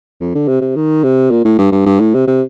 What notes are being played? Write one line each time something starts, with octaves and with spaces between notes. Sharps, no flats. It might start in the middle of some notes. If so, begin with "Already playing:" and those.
F2
D3
C3
C3
D#3
C3
A#2
A2
G2
G2
G2
A2
C3
C3